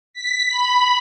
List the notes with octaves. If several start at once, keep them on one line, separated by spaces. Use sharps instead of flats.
B6
B5